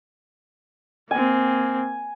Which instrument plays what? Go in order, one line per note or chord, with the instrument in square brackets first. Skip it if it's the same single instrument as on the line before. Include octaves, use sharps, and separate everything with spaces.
[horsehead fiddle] A#3 C4 [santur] G#5